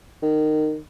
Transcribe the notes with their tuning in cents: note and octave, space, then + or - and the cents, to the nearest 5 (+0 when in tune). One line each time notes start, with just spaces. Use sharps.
D#3 -20